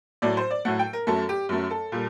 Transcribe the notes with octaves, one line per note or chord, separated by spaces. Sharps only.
A2 F#3 A3 D5
C5
D5
A2 F#3 A3 F#5
G5
A#4
F#2 F#3 A3 A4
G4
F#2 F#3 A3
A4
A#2 G3